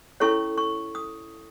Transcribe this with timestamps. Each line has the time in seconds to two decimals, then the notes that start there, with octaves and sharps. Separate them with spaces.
0.20 C#4 E4 A4 C#5 C#6
0.58 C#6
0.95 D#6